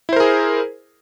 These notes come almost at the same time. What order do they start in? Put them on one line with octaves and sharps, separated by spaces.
E4 C5 A#4 G#4